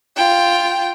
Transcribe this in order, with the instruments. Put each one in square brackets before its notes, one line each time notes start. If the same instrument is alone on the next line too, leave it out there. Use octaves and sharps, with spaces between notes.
[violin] F4 G5